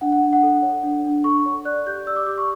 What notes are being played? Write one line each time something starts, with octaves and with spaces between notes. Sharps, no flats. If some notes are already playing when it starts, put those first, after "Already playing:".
D4 F#5
F#5
D4
F#5
A4
C#5
D4
D4
A4 C#6
C#5
D5 F#6
G4 G6
D5 E6
D6
G4 D6
C#6